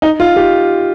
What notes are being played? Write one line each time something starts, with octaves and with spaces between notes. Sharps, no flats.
D#4
F4
G4